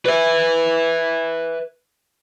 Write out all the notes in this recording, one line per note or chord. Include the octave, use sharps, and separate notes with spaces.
B4 E5